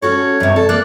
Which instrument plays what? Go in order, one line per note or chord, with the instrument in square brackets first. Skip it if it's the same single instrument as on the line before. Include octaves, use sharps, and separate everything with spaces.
[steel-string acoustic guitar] C#4 F#4 A4 [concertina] C#5
[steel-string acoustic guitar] G2 C3
A4
[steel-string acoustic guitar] A#3 [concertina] D5 F#6